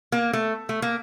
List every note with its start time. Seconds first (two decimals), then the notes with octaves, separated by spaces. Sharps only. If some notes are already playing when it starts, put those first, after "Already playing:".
0.12 A#3
0.33 A3
0.69 A3
0.82 A#3